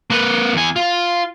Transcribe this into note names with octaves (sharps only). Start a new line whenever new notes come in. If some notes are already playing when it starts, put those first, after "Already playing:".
A#3 B4
E2 G#5
F4